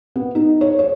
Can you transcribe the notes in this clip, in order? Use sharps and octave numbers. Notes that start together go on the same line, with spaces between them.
B3
D#4
C#5
C#5